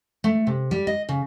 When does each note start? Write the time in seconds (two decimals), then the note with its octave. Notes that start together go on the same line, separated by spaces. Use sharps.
0.24 A3
0.47 C3
0.71 G3
0.87 D#5
1.09 C#3